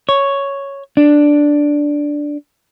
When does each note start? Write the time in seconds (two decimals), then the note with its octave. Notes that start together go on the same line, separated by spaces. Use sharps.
0.09 C#5
0.97 D4